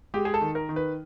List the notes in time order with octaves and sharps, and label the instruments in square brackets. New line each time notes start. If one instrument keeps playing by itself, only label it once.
[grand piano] G#3 G4
G#4
A4
D#3
A#4
D#3
B4